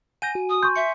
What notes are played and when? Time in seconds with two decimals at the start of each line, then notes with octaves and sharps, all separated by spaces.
0.22 F#5 G#5 G6 A#6 D#7
0.35 F#4
0.49 D#6
0.63 C6 C#6 G6
0.76 E5 C#7